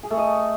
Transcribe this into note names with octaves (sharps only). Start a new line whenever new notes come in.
G#4
A3
D#5